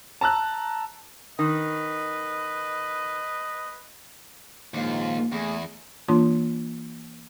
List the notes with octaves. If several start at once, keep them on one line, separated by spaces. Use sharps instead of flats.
A5 A#5 E6 F#6
D#3 B4 D#5
A#1 D#2 G#2 F4
E2 A3 G#4
E3 A#3 D4 F4 C6